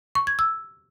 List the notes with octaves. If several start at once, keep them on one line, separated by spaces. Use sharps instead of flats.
C#6
G#6
E6